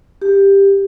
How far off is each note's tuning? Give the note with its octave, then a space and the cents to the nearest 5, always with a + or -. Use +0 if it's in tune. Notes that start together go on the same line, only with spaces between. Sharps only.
G4 +10